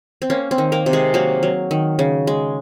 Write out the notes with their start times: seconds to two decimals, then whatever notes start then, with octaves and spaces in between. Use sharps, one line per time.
0.22 C4
0.30 A#3 C#4
0.51 C4
0.58 D#3
0.72 A#3 A#4
0.86 C3
0.93 G#3 G#4
1.14 F#3 A#3 F#4
1.43 F#3
1.71 D#3
1.99 C#3
2.27 G#3